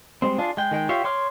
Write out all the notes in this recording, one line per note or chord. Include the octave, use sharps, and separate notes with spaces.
G3 G#3 C4
D4 F4 G#4
G#3 G5
D#3 G#3 G5
F4 G4 C#5 E5 F5
C#5 C6 D6 F6